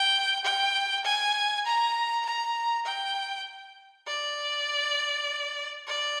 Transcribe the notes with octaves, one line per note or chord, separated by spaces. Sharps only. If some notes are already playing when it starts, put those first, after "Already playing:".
Already playing: G5
G5
G#5
A#5
A#5
G5
D5
D5